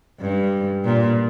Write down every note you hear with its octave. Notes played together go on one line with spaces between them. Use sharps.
G2
A#2